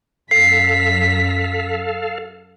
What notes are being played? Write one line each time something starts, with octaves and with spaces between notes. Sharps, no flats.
F#2 A4 F5 B6 C7